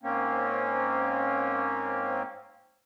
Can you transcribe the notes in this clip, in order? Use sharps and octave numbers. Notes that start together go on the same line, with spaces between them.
G#2 A#3 C4 C#4